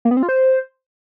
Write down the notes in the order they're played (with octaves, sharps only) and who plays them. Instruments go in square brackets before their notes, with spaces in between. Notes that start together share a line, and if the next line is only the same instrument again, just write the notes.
[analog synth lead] A#3
B3
C4
F4
C5